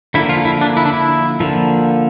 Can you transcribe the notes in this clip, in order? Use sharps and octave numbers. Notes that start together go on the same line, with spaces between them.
D3 F3 A#3 E4
F4
E4
D4
E4
D4
E4
D3 F3 A#3